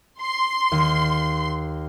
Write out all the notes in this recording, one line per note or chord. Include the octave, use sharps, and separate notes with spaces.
C6
D#2 C7